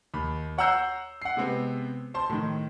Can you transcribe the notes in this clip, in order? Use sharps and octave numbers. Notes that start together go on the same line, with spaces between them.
D#2 B5
C#5 F#5 A#5 E6 G6 C7
F#5 C7
C3 G#3 B3 C4
C5 A5 C6
A2 D#3